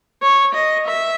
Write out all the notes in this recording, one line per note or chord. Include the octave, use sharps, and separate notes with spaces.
C#5
D#5
E5